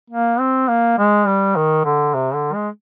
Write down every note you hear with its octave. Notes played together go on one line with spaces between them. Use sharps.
A#3
C4
A#3
G#3
G3
D#3
D3
C3
D3
G#3